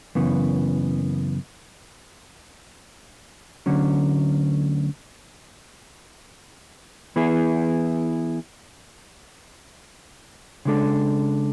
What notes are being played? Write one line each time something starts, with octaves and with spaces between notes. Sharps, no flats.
F#2 C#3 E3 B3
D2 D3 F#3 C#4
E3 B3 E4 G#4
C#3 G#3 D4 A4